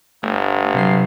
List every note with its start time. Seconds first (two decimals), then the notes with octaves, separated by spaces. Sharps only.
0.23 G1 A3
0.74 C3 F#3 C7